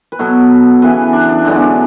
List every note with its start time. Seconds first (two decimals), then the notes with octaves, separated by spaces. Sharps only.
0.12 B4
0.19 B2 F#3 B3 A4
0.82 C#3 E3 B3 B4
1.13 D4
1.29 D4
1.45 F#2 D3 G#3 B3 D4